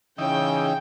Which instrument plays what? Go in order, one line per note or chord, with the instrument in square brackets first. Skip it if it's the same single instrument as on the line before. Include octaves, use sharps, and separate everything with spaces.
[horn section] C#3 [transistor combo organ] E3 D#4 [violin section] G5